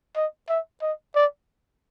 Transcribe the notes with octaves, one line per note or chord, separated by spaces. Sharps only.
D#5
E5
D#5
D5